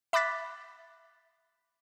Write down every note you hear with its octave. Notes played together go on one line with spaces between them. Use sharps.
E5 B5 D6 F#6 A6 B6